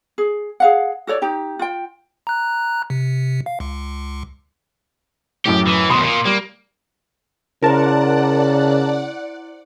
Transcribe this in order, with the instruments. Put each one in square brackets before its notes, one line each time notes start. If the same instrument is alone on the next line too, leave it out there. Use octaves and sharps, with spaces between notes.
[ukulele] G#4
G#4 F5 F#5
F#4 A4 C#5 D5
D#4 G4
F4 G5
[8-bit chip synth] A#5 F#6
C3
F5
C#2
[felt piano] F#2 A2 [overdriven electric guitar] G4
[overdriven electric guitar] E3
[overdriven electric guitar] D#2 B2 [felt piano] C6 D#6
[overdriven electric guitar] A#2
[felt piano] G3 [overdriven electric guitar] A#3
[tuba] C#3 [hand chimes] E4 C5 [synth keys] A#4 A5 [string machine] D5 F#5